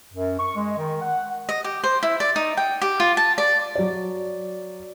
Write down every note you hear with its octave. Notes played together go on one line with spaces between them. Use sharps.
F#2
C#6
G#3
D#3
F#5
D#5
G4
C5
E4
D5
D#4
G5
G4
F4
A5
D5
F#3 D5